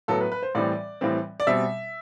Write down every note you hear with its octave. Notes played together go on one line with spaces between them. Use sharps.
A2 F#3 B3 A4
B4
B4
C5
A2 E3 G3 C4 D5
A2 E3 G3 C4
D5
B2 G3 C4 E5